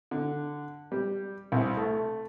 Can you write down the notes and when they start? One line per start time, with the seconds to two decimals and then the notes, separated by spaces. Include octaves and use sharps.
0.11 D3
0.92 G3
1.52 C2
1.77 A3